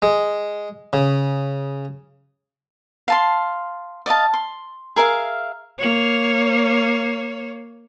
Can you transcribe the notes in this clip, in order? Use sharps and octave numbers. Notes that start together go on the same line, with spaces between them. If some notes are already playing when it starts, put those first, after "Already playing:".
G#3
C#3
F5 A5 C6
D5 D#5 F5 A5
C6
G#4 A#4 E5 F5
A#3 C#5